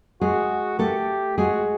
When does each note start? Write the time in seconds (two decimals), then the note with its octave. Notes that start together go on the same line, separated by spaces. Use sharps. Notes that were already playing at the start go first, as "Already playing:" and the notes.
0.21 G#3 F#4 G#4
0.79 A3 G4 A4
1.38 G#3 F#4 G#4